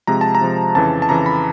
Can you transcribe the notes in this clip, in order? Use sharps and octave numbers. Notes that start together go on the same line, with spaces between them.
C3 F3 G#3 A#5
A5
A#5
C3 F3 G#3
F2 C#3 E3 A5
A5
F2 C#3 E3 A#5
B5